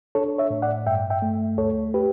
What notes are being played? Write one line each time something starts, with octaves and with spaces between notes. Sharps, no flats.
D4 A4 C#5
C#5 E5
A2
D5 F#5
G2 E5 G5
E5 G5
A3
D2 A4 C#5
G4 B4